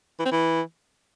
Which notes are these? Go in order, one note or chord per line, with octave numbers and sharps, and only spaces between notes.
E3
C4
E3